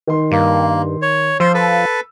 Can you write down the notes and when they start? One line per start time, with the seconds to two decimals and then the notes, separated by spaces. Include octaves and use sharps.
0.07 D#3 C6
0.32 G2 A#3
1.02 C#5
1.40 F3 C5 E6
1.54 A4 B4